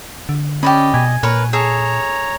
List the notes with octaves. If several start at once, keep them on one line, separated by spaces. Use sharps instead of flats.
D3
C#4 G4 D5 D#5 B5
B2 G#5
A#2 A#4 B4 C#5
G#4 A4 C#5 A#5